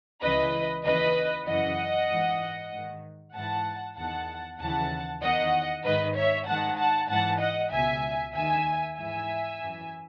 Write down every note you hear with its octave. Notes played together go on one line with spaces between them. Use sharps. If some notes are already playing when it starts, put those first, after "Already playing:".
C#2 C#3 E3 B4 D#5
D#2 C#3 E3 B4 D#5
F#2 C#3 E3 D#5 F#5
G#2 E3
G#2 D#3
G#2 E3 F#5 A5
E2 D#3 F#5 A5
D#2 C#3 E3 F#5 A5
E2 D#3 D#5 F#5
G#2 D#3 B4 D#5
C#5 E5
G#2 D#3 F#5 A5
F#5 A5
G#2 E3 F#5 A5
D#5 F#5
C#2 B2 E5 G#5
D#2 D#3 E5 G#5
G#2 E3 E5 G#5
F#2 E3